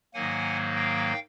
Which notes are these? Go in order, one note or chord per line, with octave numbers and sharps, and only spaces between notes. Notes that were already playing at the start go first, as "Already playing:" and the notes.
G#2 D#3 F#3 A#3 F#5 G#5
F5 G5